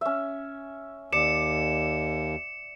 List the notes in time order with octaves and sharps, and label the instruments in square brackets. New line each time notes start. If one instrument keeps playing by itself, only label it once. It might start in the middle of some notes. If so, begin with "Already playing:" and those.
[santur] C#4 E5
[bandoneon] D#2 [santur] D5 [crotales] C#7 E7